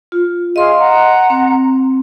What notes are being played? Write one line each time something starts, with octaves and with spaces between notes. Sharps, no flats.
F4
G#4 D#5 F5 C6
F#5 A#5
C4